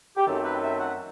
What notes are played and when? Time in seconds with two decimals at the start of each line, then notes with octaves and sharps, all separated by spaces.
0.17 G4
0.27 F#2 D#3 F#3 A3 C4 A4
0.44 B4
0.63 E5
0.80 F#5